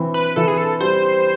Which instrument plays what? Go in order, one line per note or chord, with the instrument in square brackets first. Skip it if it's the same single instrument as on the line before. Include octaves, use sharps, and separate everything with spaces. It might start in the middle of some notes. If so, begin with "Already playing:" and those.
Already playing: [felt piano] E3 C4
[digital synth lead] B4
[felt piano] E3 [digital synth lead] A4
[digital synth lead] G#4
A4
[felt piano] G3 [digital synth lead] C5